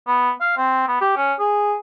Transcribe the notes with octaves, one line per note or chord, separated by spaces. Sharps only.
B3
F5
C4
B3
G4
C#4
G#4